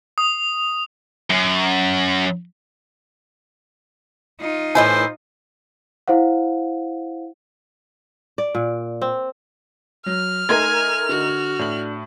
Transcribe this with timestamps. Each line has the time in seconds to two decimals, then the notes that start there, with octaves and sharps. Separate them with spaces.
0.18 D#6
1.30 F#2
4.40 D#4 F4
4.75 A2 E3 E4 C5 D#5 G#5
6.08 E4 C5 F5 F#5
8.38 D5
8.55 A#2
9.02 C4
10.06 F#3 F6
10.49 A3 D#4 A#4 G#5 A#5 C6 G#6
11.09 D3 F#4
11.59 A2 D4 F#7